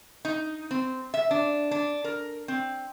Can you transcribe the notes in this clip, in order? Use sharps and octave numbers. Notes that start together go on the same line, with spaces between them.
D#4
C4
E5
D4
D4
A#4
C4